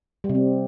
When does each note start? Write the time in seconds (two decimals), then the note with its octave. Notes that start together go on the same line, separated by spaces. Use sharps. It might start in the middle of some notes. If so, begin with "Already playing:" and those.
0.24 G3
0.29 C3
0.35 C4